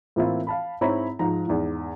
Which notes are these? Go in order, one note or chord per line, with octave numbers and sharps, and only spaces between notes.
A2 E3 A#3 C4 E4 F4
F5 A5 B5
G#2 C4 E4 C#5 A#5 B5
G#2 F3 A#5
E2 G#2